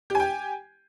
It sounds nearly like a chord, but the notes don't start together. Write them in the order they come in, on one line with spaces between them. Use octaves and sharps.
G4 G#5 G5